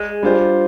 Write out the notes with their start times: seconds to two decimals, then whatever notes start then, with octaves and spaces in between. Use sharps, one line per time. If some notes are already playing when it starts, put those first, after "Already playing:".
Already playing: G#3
0.23 G3 D4 F4 C5